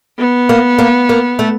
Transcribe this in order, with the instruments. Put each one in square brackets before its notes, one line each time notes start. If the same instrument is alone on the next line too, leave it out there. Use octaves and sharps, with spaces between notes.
[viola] B3
[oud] A#3
A#3
A#3
A3